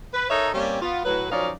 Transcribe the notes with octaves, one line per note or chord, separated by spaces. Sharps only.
B4
D#4 A4 A#4 C#5 D#5 E5
G3 A#3 C4 C#4 G4
B3 F4
A2 F#3 B4
F#2 F3 C#4 D#4 D5 F5